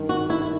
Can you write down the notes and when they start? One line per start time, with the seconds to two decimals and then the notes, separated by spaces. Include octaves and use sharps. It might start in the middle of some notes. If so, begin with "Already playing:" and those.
Already playing: G2 D#3
0.09 F#4
0.30 E4